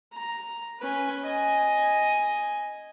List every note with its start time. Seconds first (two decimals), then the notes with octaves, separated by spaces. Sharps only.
0.13 A#5
0.80 C#4 B4
1.25 D#5 G#5